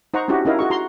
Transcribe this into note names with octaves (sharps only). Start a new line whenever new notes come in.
D#4 C5 F#5 A#5 C#6
C#4 D4 E4 F#4 G4
C#4 D#4 E4 A#4 D#5 F5
F#4 G#4 C#6
F#4 A#5 C6